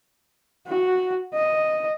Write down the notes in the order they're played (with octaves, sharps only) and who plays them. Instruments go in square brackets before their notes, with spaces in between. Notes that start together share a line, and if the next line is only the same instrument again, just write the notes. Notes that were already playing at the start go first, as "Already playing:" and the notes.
[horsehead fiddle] F#4
D#5